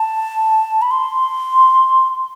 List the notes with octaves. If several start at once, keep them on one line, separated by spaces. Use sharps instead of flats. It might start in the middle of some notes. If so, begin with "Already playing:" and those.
Already playing: A5
B5
C6